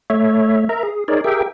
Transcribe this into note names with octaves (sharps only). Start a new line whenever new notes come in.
A3 C#5 E5
A#4 E5 A#5
G#4
D#4 G#4 A#4 C#5 D5
G4 G#4 A#4 E5 G5